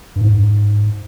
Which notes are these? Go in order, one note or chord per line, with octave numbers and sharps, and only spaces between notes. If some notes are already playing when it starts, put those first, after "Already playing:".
G2
G#2